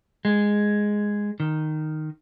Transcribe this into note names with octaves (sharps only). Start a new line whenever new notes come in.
G#3
D#3